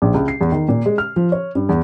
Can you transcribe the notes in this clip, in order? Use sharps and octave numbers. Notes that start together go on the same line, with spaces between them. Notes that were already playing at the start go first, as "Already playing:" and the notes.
A#1
C#2
C7
E2
D#3
A#2
G#3
F6
F3
C#5
G2
E2